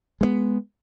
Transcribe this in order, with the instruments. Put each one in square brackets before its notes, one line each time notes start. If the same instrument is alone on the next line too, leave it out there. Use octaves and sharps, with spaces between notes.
[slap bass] G#3 A3 B3